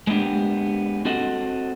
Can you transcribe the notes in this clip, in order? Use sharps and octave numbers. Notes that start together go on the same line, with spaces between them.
G#3 A#3 B3 D4 G4
C4 F#4 A4 D#5 F#5